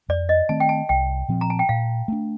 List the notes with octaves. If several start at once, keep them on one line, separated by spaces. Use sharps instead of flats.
F2 D5
D#5
D#3 A3 C4 A5
G5
A5
C2 G5
A#2 F3 C4
A#5
A5
G5
A#2 F5
A3 D4